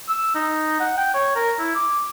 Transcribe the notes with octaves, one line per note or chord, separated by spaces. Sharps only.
E6
D#4
F#5
G5
C#5
A#4
E4
D6